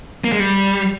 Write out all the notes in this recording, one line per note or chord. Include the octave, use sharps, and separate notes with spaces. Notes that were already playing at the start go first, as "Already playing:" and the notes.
A#3
G#3
G3